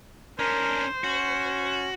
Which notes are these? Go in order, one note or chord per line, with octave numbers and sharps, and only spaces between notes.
C#4 D4 A#4 C5
C#4 F#4